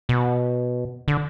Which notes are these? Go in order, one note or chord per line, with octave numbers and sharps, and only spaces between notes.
B2
D3